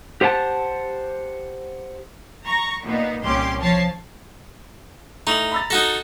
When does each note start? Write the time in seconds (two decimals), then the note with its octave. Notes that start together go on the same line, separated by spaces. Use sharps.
0.21 G4 C5 F#5 G5 A5
2.47 A#5 C#6
2.83 A#2 B3 D#4
3.22 C2 A#2 C#4 G4 C6 D6
3.60 F3 C#5 A5 C7
5.27 A2 D#4 A#5 F7 F#7
5.52 B5 E6 A6
5.70 D#4 F#4 A4 A#6